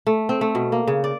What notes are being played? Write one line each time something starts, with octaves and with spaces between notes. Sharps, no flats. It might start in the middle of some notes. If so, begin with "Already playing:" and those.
A3
C4
A3
B2
A#3
C#3
D5